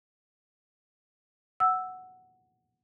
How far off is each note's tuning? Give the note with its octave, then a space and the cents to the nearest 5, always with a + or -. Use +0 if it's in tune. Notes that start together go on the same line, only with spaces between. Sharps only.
F#5 +0 E6 +0